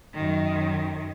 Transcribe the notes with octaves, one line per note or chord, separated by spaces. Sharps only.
F#2 D#3